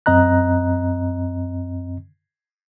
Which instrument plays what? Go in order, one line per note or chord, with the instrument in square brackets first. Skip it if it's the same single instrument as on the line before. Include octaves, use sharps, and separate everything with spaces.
[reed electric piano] F#2 C4 D#5 A#5 F#6